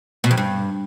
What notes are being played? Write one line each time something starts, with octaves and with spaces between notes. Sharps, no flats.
B2
F2
G2